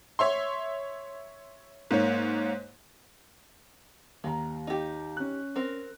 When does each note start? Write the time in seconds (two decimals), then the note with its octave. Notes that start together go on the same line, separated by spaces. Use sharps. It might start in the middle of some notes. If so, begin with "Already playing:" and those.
0.19 C#5 E5 C6
1.91 G#2 A#3 C#5
4.24 D#2 D#3 A#5
4.67 D#4 G4
5.17 C#4 F#6
5.56 C4 A#4